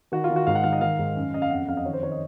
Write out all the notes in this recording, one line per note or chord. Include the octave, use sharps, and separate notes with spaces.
D#3 F#4
F4
D#3
F#4
G#2 F5
F#5
D#3 F5
D#5
D#3 F5
G#2
F#2
F#2 D#5
F5
F2 F#5
F2 F5
D#5
D#3 C#5
C5
D#3 C#5
D#5